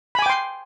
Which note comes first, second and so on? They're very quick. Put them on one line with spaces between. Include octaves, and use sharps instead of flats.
B5 G#5 D6 G5 C6